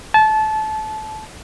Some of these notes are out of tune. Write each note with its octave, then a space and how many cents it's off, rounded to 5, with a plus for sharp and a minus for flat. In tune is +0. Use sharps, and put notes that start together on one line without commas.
A5 -25